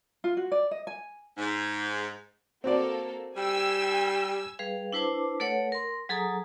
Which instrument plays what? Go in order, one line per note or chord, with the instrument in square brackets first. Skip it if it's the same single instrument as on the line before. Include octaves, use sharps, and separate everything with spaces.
[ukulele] F4
F#4
D5
D#5
G#5
[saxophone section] G#2
[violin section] A#3 A4 [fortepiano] C4 F#4 D5
[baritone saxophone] G3 [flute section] G5 [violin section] G#5 E6
[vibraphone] G3 G#4 B4 F5
D4 E4 B4 C5 A5 D6
A3 A4 B4 C#5 F#5
A#4 C6
F#3 G#4 A4 G#5 A#5 D#6